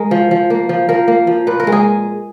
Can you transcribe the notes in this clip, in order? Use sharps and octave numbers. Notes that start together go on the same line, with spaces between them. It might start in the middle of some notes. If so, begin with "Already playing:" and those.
Already playing: G#3 A#4
F3
F3
A#3
F3
F3 A#4
A#3
F3
A#2 B4
A#4
G#3
G#4